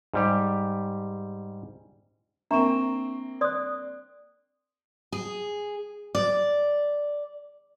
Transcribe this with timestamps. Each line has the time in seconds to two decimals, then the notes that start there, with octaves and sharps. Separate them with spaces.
0.14 G#2 G3 G4
2.51 A#3 C4 D4 E5 A#5 C#6 E7
3.41 D5 C6 D#6 F#6
5.12 G#4
6.15 D5